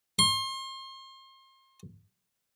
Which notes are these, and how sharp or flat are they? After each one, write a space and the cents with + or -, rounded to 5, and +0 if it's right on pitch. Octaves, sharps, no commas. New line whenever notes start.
C6 +35